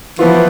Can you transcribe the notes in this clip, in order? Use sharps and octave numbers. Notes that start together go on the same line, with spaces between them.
E3 F3 B3 F4